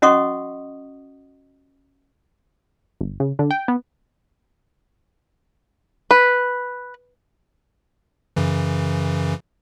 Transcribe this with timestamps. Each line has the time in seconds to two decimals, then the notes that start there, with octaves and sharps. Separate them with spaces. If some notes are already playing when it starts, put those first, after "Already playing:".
0.02 C#4 F#4 D#5 F#5 C#6 D#6
3.01 G1
3.20 C#3
3.39 D3
3.51 G5
3.68 B3
6.11 B4
8.36 F#2 C#3 E3